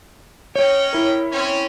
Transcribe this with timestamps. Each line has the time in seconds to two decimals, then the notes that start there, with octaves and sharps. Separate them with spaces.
0.56 C#4 C#5 D#5 G5
0.93 E4 A#4
1.31 C4 C#4